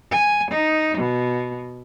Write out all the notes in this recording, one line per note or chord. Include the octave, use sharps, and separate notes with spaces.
G#5
D#4
B2